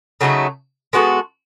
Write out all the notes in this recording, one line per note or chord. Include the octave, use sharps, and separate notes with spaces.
C#3 F#3 A3 D#4
G#3 B3 F#4 A4